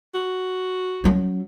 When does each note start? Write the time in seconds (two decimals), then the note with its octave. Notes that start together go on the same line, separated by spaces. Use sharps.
0.15 F#4
1.04 F#3 C#4